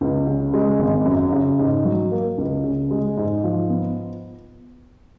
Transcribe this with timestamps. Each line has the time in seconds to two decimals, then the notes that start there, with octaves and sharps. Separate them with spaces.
0.01 C#2
0.27 C#3
0.54 G#3
0.79 G#1
1.05 F#2
1.32 C#3
1.59 G#2
1.85 F#3
2.11 A#3
2.38 C#2
2.64 C#3
2.91 G#3
3.17 G#2
3.44 F3
3.70 B3